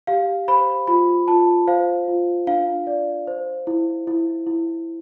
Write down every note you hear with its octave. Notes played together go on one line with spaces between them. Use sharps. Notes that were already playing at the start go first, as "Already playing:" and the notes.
G4 F5
C5 B5
F4 B5
F4 A5
C5 F5
F4
D4 F5
D5
C5
E4
E4
E4